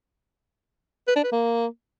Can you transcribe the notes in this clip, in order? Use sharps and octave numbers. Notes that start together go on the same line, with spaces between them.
B4
D4
B4
A#3